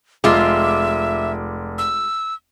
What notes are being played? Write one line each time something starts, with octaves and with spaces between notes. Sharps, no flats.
F1 G#3 F4 E5 D6
E6